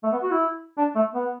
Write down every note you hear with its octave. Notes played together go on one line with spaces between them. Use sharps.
A3
B3
F#4
E4
D4
A3
B3